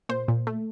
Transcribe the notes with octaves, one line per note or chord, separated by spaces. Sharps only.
A#2 C5
A#2
A3